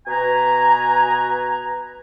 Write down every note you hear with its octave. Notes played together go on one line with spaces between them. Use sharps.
B2 B4 G#5 A#5